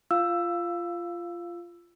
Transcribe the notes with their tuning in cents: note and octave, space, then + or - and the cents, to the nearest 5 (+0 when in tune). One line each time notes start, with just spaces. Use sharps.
F4 -15 F5 +0 E6 +10